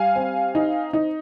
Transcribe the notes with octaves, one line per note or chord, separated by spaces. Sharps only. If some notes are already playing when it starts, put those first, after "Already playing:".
Already playing: G3 F5 G#5
C4
D#4
D#4